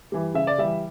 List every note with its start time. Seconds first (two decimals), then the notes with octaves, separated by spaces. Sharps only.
0.12 E3 G3
0.34 C#3 E5
0.47 D5
0.58 E3 G3 E5